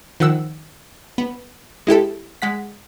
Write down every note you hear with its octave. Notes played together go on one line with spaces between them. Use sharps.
D#3 F3 F#5 E6
B3
G#3 E4 G4 A4
G#3 F#5 B6